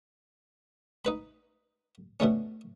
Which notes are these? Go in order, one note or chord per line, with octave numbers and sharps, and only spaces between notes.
D#4 B4 B5
B2 D3 A3 C#4